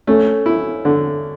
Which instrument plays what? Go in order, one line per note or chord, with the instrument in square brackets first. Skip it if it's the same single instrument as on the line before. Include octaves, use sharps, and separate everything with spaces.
[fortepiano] A3 [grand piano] C#4
[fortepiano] E4
D3